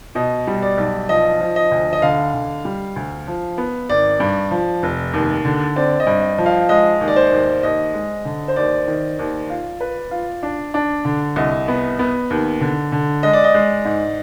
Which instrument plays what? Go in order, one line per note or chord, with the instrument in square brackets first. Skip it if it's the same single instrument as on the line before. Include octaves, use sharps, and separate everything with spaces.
[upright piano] B2 [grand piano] D#5
[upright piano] G3
[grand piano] D5
[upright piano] B1
[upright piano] F3 [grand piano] D#5
[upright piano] F3
[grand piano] D#5
[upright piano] D2
[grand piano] D#5
[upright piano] D3 [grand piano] F5
[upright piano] D3
G3
D2
F3
B3
[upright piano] G#1 [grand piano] D5
[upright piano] G2
F3
F1
D#2
D3
[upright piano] C4 [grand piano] D5
[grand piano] D#5
[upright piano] G2
[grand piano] D#5
[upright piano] F3
[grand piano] F5
[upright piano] G#3 [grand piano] D#5
[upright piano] D#2
[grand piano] D5
C5
[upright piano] D#2
[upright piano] D#2 [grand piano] D#5
[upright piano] G#3
D3
[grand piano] C5
[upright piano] D#2 [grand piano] D5
[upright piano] D#3
D#2
F4
B4
F4
D4
D4
D3
[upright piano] C2 [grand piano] D#5
[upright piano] B3
B3
D#2
D3
D3
[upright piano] G#3 [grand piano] D#5
[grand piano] D5
D#5
[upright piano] G#3
G#2